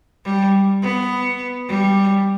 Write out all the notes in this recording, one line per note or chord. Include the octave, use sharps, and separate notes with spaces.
G3
B3
G3